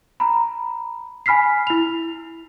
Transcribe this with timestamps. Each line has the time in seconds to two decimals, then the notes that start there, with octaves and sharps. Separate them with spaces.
0.20 A#5 B5
1.26 G#5 B5 F6 B6 C7
1.67 E4 F7